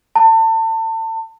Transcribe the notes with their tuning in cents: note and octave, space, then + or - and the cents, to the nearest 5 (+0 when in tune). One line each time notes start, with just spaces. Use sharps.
A5 +35